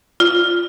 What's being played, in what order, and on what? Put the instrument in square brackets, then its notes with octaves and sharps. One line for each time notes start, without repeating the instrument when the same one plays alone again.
[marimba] F4